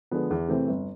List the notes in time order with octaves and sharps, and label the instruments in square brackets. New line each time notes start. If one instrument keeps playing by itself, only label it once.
[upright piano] D3 F3 G#3 B3
E2
C3 E3 A3 C4
G1